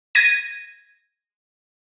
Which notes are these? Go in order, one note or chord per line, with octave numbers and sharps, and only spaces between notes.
G#6 A#6 D#7